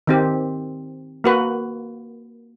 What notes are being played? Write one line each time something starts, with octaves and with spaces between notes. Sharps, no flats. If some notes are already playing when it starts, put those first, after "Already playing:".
D#3 C4 G4
A#3 F#4 B4